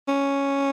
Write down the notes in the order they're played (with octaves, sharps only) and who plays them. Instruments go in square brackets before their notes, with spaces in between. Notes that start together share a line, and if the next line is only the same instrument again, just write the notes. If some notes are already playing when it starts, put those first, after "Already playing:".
[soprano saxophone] C#4